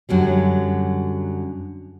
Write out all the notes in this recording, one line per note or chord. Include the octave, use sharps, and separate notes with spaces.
F#2 D3 F#3 G3